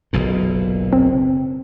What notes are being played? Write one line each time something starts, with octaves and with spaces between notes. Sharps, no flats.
F#1 B1 A#2
C4